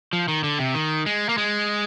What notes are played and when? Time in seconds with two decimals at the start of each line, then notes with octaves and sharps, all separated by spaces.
0.13 F3
0.28 D#3
0.44 D3
0.59 C3
0.74 D#3
1.06 G#3
1.29 A#3
1.38 G#3